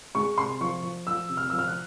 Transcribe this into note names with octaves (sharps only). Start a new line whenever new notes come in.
G#3 C#6
C3 C6
F3 C#6
F3
F3 E6
C3
F6
F3 E6
F6
F#6